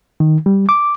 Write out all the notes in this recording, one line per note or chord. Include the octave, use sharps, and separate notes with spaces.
D#3
G3
D6